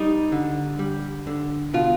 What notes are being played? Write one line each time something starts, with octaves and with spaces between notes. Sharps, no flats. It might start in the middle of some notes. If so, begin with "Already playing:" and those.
Already playing: G3 D#4
D3
G3
D3
B2 F4